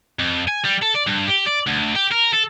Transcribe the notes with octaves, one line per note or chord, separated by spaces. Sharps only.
F2
G#5
G3
A4
D5
G2
G4
D5
D2
G4
A#4
A4